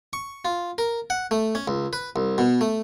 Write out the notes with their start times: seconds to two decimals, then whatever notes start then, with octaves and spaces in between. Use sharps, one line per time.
0.13 C#6
0.45 F4
0.78 A#4
1.10 F#5
1.31 A3
1.55 C#4
1.68 C#2
1.93 B4
2.16 C2
2.38 B2
2.61 A3